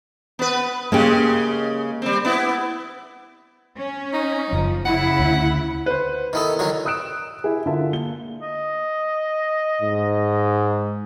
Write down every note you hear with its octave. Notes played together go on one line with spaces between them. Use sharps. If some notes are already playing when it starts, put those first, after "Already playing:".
B3 B4
C#3 G#3 A#3 G4
G3 C4
B3 E4
C#4
D#4
F#1 F3
C#3 E4 F#5
D2
B4 C5
D#3 B3 E4 A4 D#6
D3 D#3 F#3
D#6 E6 F#6 D7 E7
E4 G4 G#4
D3 F4 A#4 E5 A5
A#3 G7
D#5
G#2